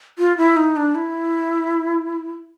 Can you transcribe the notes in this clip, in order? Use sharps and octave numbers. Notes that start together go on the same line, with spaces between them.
F4
E4
D#4
D4
E4